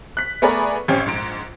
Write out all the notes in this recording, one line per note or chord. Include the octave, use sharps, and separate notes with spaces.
F#6 B6
A3 B3 G#4 A#4 B4 D5
A1 C4 C#4 G4 C5 G#6
A#1 G#2 D7